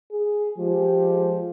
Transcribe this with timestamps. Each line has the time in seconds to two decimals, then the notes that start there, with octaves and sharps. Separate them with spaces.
0.11 G#4
0.58 F3 G#3 G4